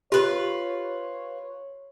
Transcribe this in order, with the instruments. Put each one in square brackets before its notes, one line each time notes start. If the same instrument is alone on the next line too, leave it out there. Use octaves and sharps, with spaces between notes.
[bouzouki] F4 B4 [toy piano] G4 [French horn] C#5